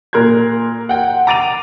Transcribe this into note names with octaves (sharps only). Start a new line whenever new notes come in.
A#2 A#4 C6 F#6 G#6
F#5 G5
A#5 D6 A6 D7 D#7 F7